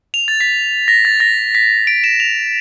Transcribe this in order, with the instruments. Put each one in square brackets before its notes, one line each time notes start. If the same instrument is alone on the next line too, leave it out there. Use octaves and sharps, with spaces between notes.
[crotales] F7
A6
B6
A#6
A6
A#6
B6
D7
E7
F7